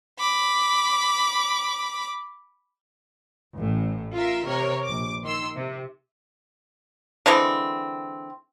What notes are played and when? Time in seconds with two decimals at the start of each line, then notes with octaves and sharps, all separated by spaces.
0.19 B5 D6
3.56 A1 A2
4.15 F4 A#4 E5
4.46 C3 A#4 C#5
4.85 A#1 D6
5.23 D#3 C6 E6
5.56 C3
7.26 D3 E3 G#3 C4